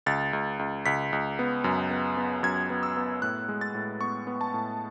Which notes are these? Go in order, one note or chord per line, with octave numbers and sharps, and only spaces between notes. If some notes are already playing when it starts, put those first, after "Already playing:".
C#2 A6
C#2
C#2
C#2 B6
C#2
B3
F#2
B3
B3
F#2 G#6
B3
E6
B3
A2 F#6
G#3
A6
A2
B3 C#6
B3
A5
A2